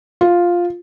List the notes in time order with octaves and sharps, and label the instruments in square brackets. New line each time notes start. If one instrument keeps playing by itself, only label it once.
[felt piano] F4